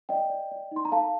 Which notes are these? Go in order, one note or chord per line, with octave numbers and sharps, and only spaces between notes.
D5 D#5 G5
D5
D5
D#4 C6
A#5
A4 F5 A5